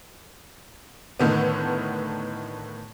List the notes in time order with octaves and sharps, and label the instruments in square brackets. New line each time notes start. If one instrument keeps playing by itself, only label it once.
[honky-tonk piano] A2 D3 D#3 B3